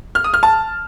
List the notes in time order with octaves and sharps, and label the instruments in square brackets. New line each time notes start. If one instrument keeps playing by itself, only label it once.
[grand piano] F6
D#6
F6
A5